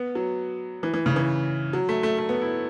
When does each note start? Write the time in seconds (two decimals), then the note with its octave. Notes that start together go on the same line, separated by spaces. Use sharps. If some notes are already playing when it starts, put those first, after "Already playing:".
Already playing: B3
0.15 F#3
0.83 E3
0.94 E3
1.06 C#3
1.16 E3
1.73 F#3
1.89 A3
2.03 A3
2.18 A3
2.29 B3
2.41 E4